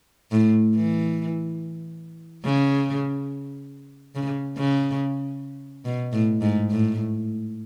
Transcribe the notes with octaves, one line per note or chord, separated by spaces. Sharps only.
A2
E3
C#3
C#3
C#3
B2
A2
G#2
A2